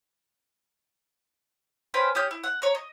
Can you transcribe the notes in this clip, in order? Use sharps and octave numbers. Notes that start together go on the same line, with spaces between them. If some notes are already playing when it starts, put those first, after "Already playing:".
C#4 B4 C5 G5
C#4 G4 D#6 G6
E4
F#5
C#5 A#5
D#5